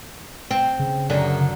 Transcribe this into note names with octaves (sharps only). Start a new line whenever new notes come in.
C4
C#3
F#2 D3 D#3